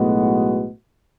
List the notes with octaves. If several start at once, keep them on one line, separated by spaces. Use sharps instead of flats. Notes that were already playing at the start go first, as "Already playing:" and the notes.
Already playing: B1 A2 G#3 B3 F#4